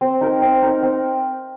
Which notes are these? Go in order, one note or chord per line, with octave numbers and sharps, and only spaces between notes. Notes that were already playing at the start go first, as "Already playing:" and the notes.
C4
D#4 A#4
C4
D#4 A#4
C4